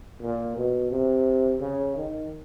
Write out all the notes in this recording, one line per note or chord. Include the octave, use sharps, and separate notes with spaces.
A#2
B2
C3
C#3
D#3